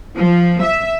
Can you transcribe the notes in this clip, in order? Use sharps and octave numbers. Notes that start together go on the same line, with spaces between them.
F3
E5